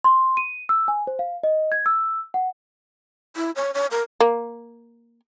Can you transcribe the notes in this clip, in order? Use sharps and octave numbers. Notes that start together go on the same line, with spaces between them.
C6
D#7
E6
G#5
C5
F5
D#5
G#6
E6
F#5
E4
C#5
C#5
A#4
A#3